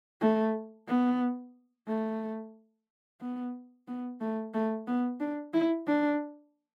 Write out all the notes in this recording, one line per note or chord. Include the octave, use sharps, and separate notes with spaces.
A3
B3
A3
B3
B3
A3
A3
B3
D4
E4
D4